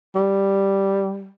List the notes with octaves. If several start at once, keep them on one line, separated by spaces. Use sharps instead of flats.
G3